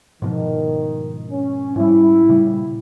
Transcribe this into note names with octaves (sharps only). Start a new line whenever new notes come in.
G#2 B2 D#3 F3
C#4
G#2 G3 E4
A#2 C#3 G3